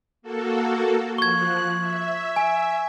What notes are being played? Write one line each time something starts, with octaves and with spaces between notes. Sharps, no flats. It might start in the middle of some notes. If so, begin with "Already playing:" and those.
A#3 F#4 A4
F3 C#6 F#6 G#6
E5
G#5